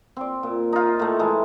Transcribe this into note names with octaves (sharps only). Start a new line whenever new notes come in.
C4 D5
A#2
D#4 F4
A2 A3
E3 G#3 A3